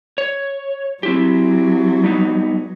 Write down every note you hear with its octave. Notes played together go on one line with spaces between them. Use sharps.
C#5
F#3 C4 E4 G4
G3 B3 D#4